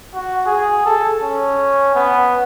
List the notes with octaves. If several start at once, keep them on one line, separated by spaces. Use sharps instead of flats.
F#4
G#4
A4
C#4
B3